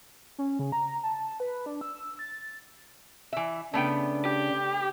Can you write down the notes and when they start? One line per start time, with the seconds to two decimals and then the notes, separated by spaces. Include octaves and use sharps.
0.38 C#4
0.59 C#3
0.72 A#5
1.04 A5
1.40 B4
1.66 D4
1.81 E6
2.19 A6
3.33 E3 E5
3.74 C#3 A3 B3 D4 G5
4.25 G4